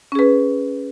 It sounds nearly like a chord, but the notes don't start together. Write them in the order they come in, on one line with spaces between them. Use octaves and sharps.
C#4 G#4 B4